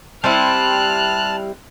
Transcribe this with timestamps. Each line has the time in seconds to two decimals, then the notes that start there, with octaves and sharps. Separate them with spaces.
0.24 G3 C4 E4 A5 F6 F#6